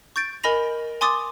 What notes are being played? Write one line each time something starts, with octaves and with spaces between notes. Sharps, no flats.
C#6 G6 A6 D7
A#4 D#5 G#5 B5 A#6 F7
G#5 C6 D6 D#6 A6